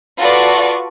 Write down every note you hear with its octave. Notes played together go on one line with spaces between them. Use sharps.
F4 F#4 A4 B4 D5 C#6